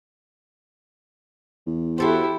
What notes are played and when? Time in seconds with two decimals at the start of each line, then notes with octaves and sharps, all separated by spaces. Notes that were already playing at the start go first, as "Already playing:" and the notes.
1.66 E2
1.98 E4 F#4 G4 A4 C5